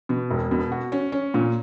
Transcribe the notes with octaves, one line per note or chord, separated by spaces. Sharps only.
B2
E1
B2
F#4
C#4
C#4
A#2